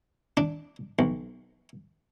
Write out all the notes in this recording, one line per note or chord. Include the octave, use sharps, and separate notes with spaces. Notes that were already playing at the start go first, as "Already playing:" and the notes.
D4
B1